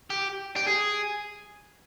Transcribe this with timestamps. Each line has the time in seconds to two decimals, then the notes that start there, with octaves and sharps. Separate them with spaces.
0.10 G4
0.56 G4
0.67 G#4